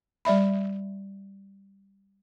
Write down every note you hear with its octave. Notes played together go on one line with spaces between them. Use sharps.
G3 D5 E5 B5